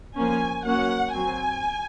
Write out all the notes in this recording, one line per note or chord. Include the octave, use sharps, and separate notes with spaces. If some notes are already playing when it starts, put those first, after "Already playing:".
F3 A#3 C#4 G#5
F#3 A#3 C#4 F#5
F#3 C4 G#5